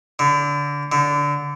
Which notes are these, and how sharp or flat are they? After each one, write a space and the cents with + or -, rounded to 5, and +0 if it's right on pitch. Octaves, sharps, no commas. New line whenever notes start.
D3 -25
D3 -20